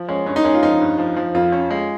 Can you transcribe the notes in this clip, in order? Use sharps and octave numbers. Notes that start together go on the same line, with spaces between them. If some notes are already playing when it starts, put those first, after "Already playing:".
Already playing: F3
G#3 C#4
G2 C#4
D#4
G#3 C#4
F4
F3 D#4
G2
F3
F3
F2 F4
C#4
G#3